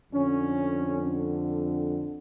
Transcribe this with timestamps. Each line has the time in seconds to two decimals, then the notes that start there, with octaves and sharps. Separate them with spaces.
0.12 F2 D3 C#4